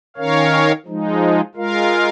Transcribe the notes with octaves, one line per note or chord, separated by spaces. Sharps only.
D#3 C#4 A#4 C#5 F5
F3 G#3 D#4
G#3 F4 A#4 F5